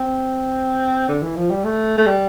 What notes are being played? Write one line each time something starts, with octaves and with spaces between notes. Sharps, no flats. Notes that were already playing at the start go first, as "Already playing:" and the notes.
Already playing: C4
D3
E3
F3
G3
A3
A3
G3